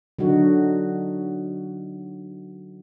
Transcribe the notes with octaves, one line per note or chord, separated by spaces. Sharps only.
D3 F#3 D#4 F#4